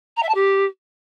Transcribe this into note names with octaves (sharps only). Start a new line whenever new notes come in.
A#5
E5
A5
G4